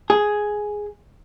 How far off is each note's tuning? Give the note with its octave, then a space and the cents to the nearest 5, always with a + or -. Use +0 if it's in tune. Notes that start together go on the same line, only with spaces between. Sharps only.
G#4 +5